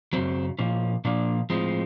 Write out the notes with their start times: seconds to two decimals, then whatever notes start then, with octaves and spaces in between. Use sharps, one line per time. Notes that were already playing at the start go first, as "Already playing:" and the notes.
0.13 F#2 C#3 F#3 C4
0.59 A#2 F3 A#3 C#4
1.05 A#2 F3 A#3 D4
1.50 A2 F3 G#3 C4